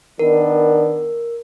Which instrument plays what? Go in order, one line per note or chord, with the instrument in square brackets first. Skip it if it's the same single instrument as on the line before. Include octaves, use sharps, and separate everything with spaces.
[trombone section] D#3 B3 D4 [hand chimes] A#4